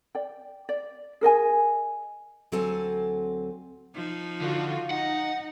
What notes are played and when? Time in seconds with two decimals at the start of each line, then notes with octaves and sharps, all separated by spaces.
0.15 D5 G5
0.69 D5
1.21 G#4 A#4 D#5 G#5
2.52 D2 F#3 C4 A4 G#5
3.94 F3 D#4
4.41 D3 F4 F#4
4.91 D#4 F#5